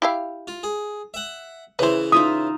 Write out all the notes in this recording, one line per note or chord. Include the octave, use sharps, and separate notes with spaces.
E4 G4 F5
F4
G#4
E5 F#5
C#3 E3 E4 B4 C5
D#4 F4 E5 D#6